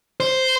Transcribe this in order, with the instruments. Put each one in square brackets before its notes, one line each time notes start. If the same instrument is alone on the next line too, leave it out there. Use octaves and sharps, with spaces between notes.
[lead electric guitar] C5